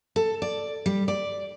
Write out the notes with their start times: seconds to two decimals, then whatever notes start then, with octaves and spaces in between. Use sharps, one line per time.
0.16 A4
0.42 D5
0.86 G3
1.08 D5